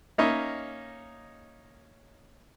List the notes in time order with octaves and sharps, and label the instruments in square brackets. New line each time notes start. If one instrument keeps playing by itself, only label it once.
[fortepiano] A#3 C#4 D#4 C#5 D#5 E5